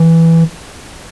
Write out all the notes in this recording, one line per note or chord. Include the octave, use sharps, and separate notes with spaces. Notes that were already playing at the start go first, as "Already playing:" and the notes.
Already playing: E3